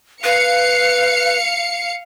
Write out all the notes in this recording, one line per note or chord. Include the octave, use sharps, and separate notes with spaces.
B4 F5 C#7